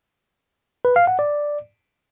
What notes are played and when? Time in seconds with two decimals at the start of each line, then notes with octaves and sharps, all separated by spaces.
0.85 B4
0.96 F5
1.07 F#5
1.19 D5